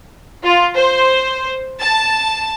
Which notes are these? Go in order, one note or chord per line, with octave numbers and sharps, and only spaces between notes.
F4
C5
A5